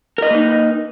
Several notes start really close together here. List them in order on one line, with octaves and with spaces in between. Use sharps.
A#4 D#5 B4 A#3 D#4